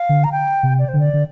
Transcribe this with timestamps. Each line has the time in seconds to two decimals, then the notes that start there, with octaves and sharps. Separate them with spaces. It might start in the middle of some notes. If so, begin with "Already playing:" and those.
Already playing: F5
0.09 D3
0.24 A#5
0.32 G5
0.63 C3
0.79 D5
0.88 C5
0.93 D3
1.00 D5
1.13 D3